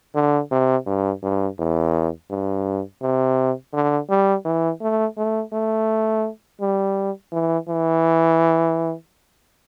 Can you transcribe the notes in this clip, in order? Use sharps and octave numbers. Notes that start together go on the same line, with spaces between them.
D3
C3
G2
G2
E2
G2
C3
D3
G3
E3
A3
A3
A3
G3
E3
E3